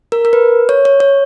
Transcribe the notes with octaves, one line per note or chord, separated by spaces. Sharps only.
A#4
A#4
B4
C#5
C#5
C#5